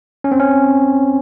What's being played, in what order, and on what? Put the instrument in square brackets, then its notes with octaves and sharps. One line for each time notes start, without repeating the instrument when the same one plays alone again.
[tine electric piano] C#4
C4
C#4